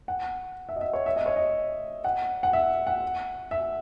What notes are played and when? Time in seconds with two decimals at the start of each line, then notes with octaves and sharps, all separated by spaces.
0.08 F#5
0.69 E5
0.76 D#5
0.81 E5
0.93 C#5
1.06 E5
1.16 D#5
1.26 C#5
1.36 D#5
2.04 F#5
2.43 F#5
2.53 E5
2.87 F#5
3.51 E5